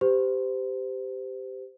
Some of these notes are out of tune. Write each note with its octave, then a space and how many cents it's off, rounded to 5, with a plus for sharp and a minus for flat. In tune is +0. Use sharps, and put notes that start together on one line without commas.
G4 +0 C5 -30